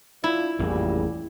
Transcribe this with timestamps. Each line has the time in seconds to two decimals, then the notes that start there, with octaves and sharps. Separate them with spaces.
0.24 D4 E4 F4
0.59 A1 F2 A#2 G3 G#4